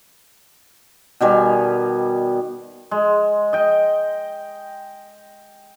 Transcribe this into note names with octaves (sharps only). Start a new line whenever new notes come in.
B2 D#3 G3 G#5
G#3
D#5 G5